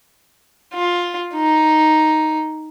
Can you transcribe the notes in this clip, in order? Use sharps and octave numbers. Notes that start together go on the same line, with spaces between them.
F4
D#4